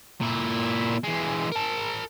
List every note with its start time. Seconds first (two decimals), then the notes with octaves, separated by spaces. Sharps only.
0.21 A#2 E4
1.04 E3 G#3
1.52 A#4 A5